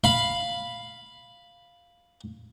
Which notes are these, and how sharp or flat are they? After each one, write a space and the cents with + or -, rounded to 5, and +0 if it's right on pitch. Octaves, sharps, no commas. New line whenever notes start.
F5 +0 B5 +0